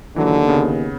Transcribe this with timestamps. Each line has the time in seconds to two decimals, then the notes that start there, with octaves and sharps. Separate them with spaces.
0.16 D#2 D3 E3 F#3
0.46 C#3 B3